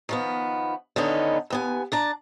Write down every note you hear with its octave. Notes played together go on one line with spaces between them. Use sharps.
D#3 F3 B3
D3 D#3 B3 C#4 D#4
D#2 B3 G#5
D4 A5 A#5